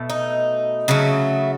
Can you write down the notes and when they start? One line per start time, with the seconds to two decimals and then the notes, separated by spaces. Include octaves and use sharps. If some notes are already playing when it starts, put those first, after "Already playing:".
Already playing: B2 A3
0.10 D#4
0.88 C#3 F#3 A3